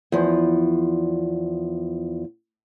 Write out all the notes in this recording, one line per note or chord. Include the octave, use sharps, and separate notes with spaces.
E2 F3